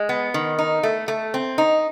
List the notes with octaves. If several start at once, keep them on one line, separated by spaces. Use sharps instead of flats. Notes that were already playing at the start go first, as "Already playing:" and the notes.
Already playing: G#3
B3
D#3
D#4
A3
A3
C4
D#4